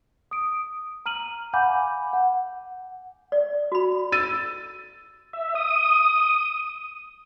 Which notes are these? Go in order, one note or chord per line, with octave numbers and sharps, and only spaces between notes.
D#6 D7
A#5 F6 D#7 F#7
F5 F#5 G#5 B5 D6 G6
F#5
D5
F#4 B5
E6 A6 D#7
E5
D#6